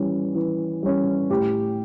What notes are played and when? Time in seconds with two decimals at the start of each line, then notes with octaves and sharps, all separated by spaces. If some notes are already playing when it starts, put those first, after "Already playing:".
Already playing: E3 G3 C#4
0.35 E3
0.83 G3 C#4
1.30 A2 G4